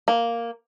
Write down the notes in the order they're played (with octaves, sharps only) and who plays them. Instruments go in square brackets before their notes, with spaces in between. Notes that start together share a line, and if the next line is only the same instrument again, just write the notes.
[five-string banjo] A#3